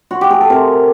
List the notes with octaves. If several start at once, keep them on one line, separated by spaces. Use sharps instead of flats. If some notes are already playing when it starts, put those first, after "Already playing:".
F#4
G4
G#4
A4
C3 A#4